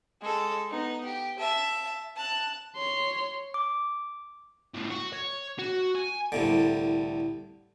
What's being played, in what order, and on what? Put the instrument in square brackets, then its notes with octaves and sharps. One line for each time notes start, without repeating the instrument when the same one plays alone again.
[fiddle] G#3 A4
B3 D#4
G4
E5 A5
A5 F#6
[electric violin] C#5 C6
[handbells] D6
[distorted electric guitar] C#2 A2
F#4
C#5
F#4
G#5
[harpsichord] C2 A2 D3